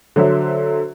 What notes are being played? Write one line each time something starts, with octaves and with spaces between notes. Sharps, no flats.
D3 F#3 C5 E5